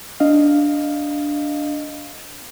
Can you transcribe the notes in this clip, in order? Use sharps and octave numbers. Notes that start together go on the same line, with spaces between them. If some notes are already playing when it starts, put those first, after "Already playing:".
D4 D#5 F5